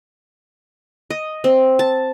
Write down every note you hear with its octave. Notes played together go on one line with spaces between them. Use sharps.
D#5
C4
A5